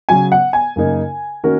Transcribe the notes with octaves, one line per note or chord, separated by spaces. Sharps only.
C#3 F#3 C#4 G#5
F#5
G#5
F#2 C#3 A#3 D#4
D#3 A#3 C#4 F#4 A#4